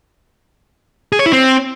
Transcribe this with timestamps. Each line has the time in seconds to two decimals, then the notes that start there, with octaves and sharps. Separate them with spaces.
1.12 G#4
1.19 C#5
1.26 E4
1.33 C4